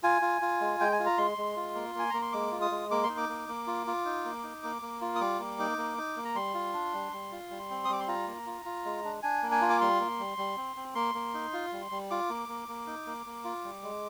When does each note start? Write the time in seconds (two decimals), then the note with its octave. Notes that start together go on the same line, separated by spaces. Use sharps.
0.03 F4 G#5
0.22 F4
0.42 F4
0.61 G#3
0.80 G#3 G5
0.92 G#5
0.99 F4
1.06 A#5
1.18 G#3 C6
1.38 G#3
1.57 F4
1.75 A#3
1.95 A#3 G#5
2.10 A#3 A#5
2.22 C6
2.32 G#3 D6
2.52 F4
2.61 D#6
2.71 G#3
2.91 A#3 D6
3.03 C6
3.09 D#4
3.17 D6
3.29 A#3
3.49 A#3
3.67 F4
3.87 F4
4.05 D#4
4.25 A#3
4.43 D#4
4.64 A#3
4.82 A#3
5.01 F4
5.15 D#6
5.20 G3 D6
5.39 A#3
5.59 D#4
5.78 A#3
5.98 D#4
6.17 A#3
6.25 A#5
6.35 G3 C6
6.54 F4
6.73 D4
6.94 G3
7.13 G3
7.32 F4
7.50 G3
7.70 C4
7.85 D#6
7.89 G3 D6
8.00 C6
8.08 F4 A#5
8.27 A#3
8.46 F4
8.65 F4
8.85 G#3
9.04 D4
9.23 D4 G#5
9.43 A#3
9.51 G#5
9.62 F4
9.70 D6
9.81 G3 C6
10.00 A#3
10.19 G3
10.38 G3
10.57 C4
10.76 C4
10.95 A#3 C6
11.15 A#3
11.34 D#4
11.53 F4
11.73 G3
11.91 G3
12.11 F4 D6
12.30 A#3
12.48 A#3
12.68 A#3
12.87 D#4
13.07 A#3
13.26 A#3
13.44 F4
13.65 G3
13.83 G#3